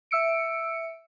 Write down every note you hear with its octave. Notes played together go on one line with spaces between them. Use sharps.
E5 E6 C#7 D7